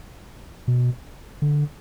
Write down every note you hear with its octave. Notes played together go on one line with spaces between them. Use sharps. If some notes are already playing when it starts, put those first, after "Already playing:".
B2
D3